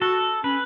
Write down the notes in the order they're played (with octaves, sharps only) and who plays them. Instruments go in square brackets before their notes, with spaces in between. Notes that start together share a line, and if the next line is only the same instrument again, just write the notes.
[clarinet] F#4 [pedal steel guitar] A4
[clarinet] C#4 [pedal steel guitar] B4